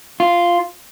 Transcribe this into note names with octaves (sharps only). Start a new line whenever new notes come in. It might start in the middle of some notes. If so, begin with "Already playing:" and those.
F4